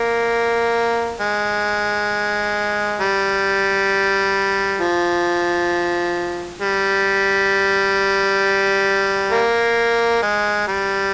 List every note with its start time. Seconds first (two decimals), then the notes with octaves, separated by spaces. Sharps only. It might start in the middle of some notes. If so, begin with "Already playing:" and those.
Already playing: A#3
1.20 G#3
3.01 G3
4.80 F3
6.61 G3
9.31 A#3
10.22 G#3
10.67 G3